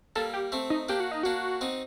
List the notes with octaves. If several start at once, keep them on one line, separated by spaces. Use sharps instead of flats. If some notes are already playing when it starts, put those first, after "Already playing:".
G3 A#3 A4
G4
A3 C4
D#4
A#3 D4 G4
F#4
D#4
A#3 D4 F#4
C4 D#4